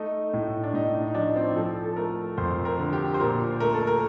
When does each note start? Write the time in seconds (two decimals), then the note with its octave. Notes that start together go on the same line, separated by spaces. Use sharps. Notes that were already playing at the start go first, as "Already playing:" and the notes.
Already playing: A3 D#4
0.33 A2
0.63 D4
0.74 A2 D#4
0.94 D#4
1.07 D#4
1.14 F3 D4
1.36 C4
1.56 F3 A4
1.85 A4
1.96 A3 A#4
2.37 F2 C5
2.65 A#4
2.79 D3
2.93 G4
3.14 C5
3.19 A#2 A#4
3.60 A3 A#4
3.74 A4
3.87 A#4